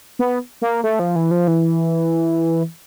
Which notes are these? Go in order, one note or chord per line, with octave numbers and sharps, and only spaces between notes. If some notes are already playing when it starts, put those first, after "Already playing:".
B3
A#3
A3
F3
E3
F3
E3